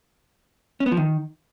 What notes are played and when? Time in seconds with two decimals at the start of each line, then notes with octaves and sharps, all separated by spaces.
0.80 C#4
0.86 B3
0.92 F3
0.97 D#3